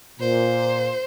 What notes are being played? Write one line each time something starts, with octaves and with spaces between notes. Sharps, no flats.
A#2 C5